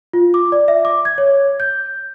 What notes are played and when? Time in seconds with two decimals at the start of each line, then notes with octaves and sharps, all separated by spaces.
0.13 F4
0.34 D6
0.52 D5
0.68 E5
0.85 D6
1.05 G#6
1.18 C#5
1.60 G6